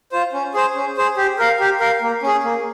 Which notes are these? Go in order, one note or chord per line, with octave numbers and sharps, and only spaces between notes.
F4 C5
C#4
G#4 C5
C#4
G#4 C5
G4
A#4 F5
G4
A#4 F5
A#3
C#4 G#4
A#3